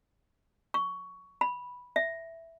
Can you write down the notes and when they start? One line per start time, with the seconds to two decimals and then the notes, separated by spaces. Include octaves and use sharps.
0.74 C#6
1.41 B5
1.96 E5